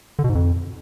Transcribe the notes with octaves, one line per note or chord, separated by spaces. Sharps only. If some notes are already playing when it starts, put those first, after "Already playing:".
D3
B2
G#2
F2